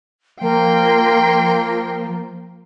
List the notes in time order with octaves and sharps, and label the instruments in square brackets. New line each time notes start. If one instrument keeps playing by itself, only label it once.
[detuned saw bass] F3 [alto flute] A#3 [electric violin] G5 C6